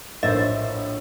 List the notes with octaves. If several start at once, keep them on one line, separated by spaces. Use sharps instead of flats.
A#1 A2 A#4 C5 D#5 E5